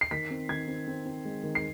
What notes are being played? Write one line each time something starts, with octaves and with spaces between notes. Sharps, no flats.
C7
D#3 B6
C4
D#3 G#6
C4
C4
C4
G#3
D#3
C7